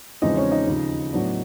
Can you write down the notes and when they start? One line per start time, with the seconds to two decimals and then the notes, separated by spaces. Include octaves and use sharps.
0.22 E2 C#3 F3 G#3 C4 D#4 D#5
0.37 C#4 C#5
0.52 D#4 D#5
0.67 D#2 C#3 F3
1.12 A2 F#3 B3 D4